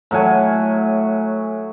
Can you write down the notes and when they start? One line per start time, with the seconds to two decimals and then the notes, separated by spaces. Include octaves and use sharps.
0.11 A2 F#3 F#5 G#5